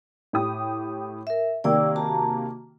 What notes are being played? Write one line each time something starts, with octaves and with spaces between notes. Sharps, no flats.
A2 G4 D#6
A#4 E5
C3 D#3 A#3 D5 G5 E6
F#4 A5 A#5